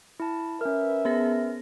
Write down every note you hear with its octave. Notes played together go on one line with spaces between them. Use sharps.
E4 A5
C#4 A#4 B4 E5
B3 G#4 A#6